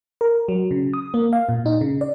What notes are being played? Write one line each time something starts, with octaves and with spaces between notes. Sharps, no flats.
A#4
F#3
C#3
D#6
A#3
F5
A#2
D#4
C#3
D5